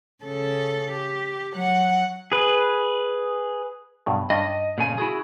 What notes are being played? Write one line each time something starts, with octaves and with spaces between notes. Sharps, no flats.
C#3 A4
G4
F#3 F#5
G#4 B4
G2 B2 F#3
G2 C#4 D4 D#5
A#2 C#3 G#5
E4 F#4 G#4